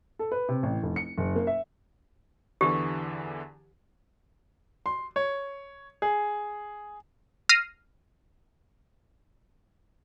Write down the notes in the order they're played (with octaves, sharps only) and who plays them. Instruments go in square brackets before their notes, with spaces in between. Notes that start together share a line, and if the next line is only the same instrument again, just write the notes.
[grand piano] A4
B4
C3
A1
F1
C#7
F#1
A#3
E5
[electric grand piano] E2 D3 E3 [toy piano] G4
[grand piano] C6
C#5
G#4
[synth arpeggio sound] F6 A#6 C7 D#7